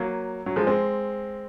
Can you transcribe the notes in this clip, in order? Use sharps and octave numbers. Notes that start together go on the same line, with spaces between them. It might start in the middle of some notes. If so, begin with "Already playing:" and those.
Already playing: F#3 A#3
F#3
F3 G#3
G#3 C4